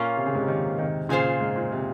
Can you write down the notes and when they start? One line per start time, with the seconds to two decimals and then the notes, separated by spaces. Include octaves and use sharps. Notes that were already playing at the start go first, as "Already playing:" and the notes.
Already playing: A#2 A#3 C#4 F4
0.17 C3
0.26 C#3
0.35 G#2 C3
0.47 C3 D#3
0.78 C3 D#3
1.09 A#2 C#3 F4 C5 F5 G#5
1.25 A#2
1.40 G#2
1.56 A#2
1.72 C3